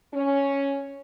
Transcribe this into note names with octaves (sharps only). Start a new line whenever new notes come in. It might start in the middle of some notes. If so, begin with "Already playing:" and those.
C#4